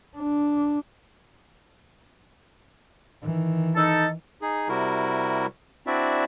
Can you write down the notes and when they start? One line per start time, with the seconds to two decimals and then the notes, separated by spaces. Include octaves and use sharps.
0.17 D4
3.22 D#3 E3
3.76 D#4 A4
4.42 D#4 G#4
4.69 C3 G3 E4 F#4 A#4
5.87 C4 D4 E4 F#4 D5 E5